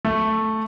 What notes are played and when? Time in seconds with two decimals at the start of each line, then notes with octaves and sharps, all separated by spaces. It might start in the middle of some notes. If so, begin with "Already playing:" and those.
0.05 A3